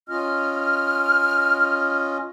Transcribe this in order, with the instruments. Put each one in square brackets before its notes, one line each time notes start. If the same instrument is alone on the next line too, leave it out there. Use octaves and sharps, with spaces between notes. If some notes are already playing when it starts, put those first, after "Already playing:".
[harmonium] C#4 F4 D#5 [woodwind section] F6